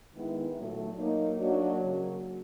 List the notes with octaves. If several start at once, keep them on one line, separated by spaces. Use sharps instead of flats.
D#3 G#3 B3 E4
A#2 F#3 A3
F#3 A#3 D#4
F#3 A#3 D4 F#4
C#3 F#3 A#3